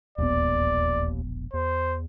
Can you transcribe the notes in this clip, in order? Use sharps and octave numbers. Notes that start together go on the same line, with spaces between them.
E1 A#1 D#2 B3 D5
E2 C5